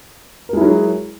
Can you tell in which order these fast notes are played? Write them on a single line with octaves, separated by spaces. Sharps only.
A#4 G#3 E4 F#3 G#4